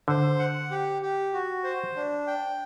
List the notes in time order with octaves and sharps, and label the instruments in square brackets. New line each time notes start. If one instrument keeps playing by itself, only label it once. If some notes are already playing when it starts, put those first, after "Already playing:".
[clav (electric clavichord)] D3 [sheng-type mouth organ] C5
[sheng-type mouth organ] F#5
G4
G4
F#4
C5
D4
G5